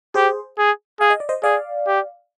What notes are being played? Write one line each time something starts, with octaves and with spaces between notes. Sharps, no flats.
G4 G#4 C5
G#4
G#4 F5
D#5
D5
C5 D#5
G#4 D5 F5
G4